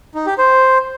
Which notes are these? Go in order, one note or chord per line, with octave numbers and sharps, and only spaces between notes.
D#4
G4
C5